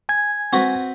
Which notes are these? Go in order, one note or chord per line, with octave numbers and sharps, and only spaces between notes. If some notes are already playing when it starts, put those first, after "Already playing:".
G#5 G#6
C4 F#4 B4